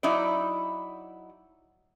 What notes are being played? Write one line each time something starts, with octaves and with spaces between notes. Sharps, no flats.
F#3 D#4 E4 D5